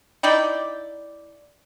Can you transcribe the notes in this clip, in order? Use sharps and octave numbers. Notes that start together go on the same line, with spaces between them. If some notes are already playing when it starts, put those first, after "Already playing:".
D#4 E4 D5 G5